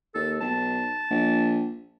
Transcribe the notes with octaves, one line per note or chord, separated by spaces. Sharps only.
D#2 A4
B1 A5
A#1